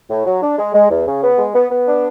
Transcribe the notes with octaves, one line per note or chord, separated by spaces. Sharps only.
A2
F#3
D4
G#3
G#3
E2
C#3
B3
G#3
B3
B3
D4